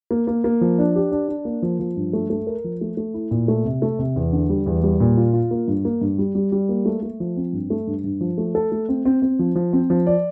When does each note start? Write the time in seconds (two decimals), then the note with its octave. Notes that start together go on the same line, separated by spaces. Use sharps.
0.11 A#3
0.27 A#3
0.44 A#3
0.61 F3
0.79 D4
0.96 G4
1.12 D4
1.29 D4
1.45 A#3
1.62 F3
1.79 F3
1.96 G2
2.13 A3
2.30 A3
2.47 A#4
2.64 F3
2.81 A3
2.97 A3
3.14 E4
3.31 A#2
3.48 A3
3.65 C3
3.82 A3
3.99 C3
4.16 E2
4.33 D3
4.49 G3
4.66 E2
4.83 G3
5.00 A#2
5.17 F4
5.33 F4
5.51 A#3
5.68 G2
5.85 A#3
6.01 G2
6.18 G3
6.35 G3
6.52 G3
6.69 A#3
6.86 A3
7.02 A3
7.20 F3
7.37 C4
7.53 G2
7.70 A3
7.87 G2
8.04 G2
8.21 F3
8.38 A3
8.55 A4
8.72 A3
8.89 C4
9.05 C4
9.22 C4
9.39 F3
9.56 F3
9.73 C4
9.90 F3
10.07 D5